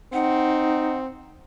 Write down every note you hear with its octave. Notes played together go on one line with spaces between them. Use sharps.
C4 D#4 F#5